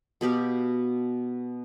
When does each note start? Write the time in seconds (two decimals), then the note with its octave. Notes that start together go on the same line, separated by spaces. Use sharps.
0.21 B2 B3 G4 F5